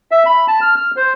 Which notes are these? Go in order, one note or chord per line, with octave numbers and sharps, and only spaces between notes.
E5
B5
A5
F6
F6
C5